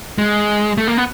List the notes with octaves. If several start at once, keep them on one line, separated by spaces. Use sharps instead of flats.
G#3
A3
A#3
B3